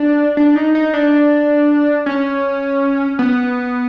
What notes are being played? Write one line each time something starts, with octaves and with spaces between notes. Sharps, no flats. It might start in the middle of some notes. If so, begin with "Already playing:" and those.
Already playing: D4
D4
D#4
D#4
D4
C#4
B3